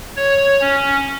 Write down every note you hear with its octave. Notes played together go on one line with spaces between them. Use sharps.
C#5
C#4